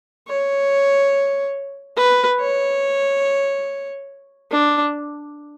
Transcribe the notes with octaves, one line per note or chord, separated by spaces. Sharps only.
C#5
B4
C#5
D4